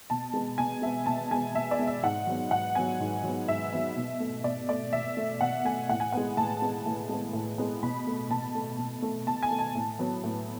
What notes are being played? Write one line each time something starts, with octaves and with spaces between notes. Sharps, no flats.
B2 A5
G#3 B3
B2 G#5
G#3 B3 E5
B2 A5
G#3 B3 G#5
B2 E5
D5
G#3 B3
E5
G#2 F#5
F#3 B3
G#2 F#5
F#3 B3 G#5
G#2
F#3 B3
G#2 E5
F#3 B3
B2
A3
B2 D5
A3 D5
B2 E5
A3
B2 F#5
A3 G#5
A2 F#5
G#5
G#3 B3 F#5
A2 A5
G#3 B3
A2
G#3 B3
A2
G#3 B3
B2 B5
A3
B2 A5
A3
B2
A3
B2 A5
G#5
A3
A5
A2
F#3 B3
A2